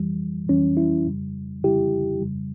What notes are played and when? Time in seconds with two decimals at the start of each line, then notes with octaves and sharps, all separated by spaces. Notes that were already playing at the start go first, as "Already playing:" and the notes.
Already playing: F2 E3 G3
0.49 F2 E3 G3 C#4
0.77 E4
1.07 F2 C#3 G3
1.64 F2 C#3 G3 E4 G4
2.21 F2 C#3 G3